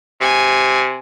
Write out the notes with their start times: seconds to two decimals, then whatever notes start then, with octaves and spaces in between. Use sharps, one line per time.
0.21 C3 G#5